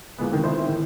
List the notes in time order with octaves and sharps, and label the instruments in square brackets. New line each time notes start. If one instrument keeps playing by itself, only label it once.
[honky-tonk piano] E2 A#2 G#3 B3
C3 D#3
E3 E4 C5
A2 D#3 E3